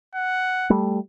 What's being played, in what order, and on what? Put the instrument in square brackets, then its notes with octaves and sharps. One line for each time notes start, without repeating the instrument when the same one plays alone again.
[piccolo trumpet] F#5
[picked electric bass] G3 A3